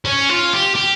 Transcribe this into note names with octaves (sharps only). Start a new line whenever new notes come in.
C#4
F4
G4
G4